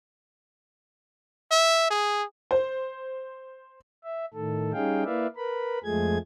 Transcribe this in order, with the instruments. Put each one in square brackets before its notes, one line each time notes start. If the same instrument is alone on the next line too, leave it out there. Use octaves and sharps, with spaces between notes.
[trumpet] E5
G#4
[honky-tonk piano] C5
[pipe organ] E5
A2 D#3 A4
G3 C#4 D#4 G#4 F5 G5
A#3 E4 B4 D5 E5 F5
A#4 B4 B5
F2 F3 G#3 A3 G#4 G#6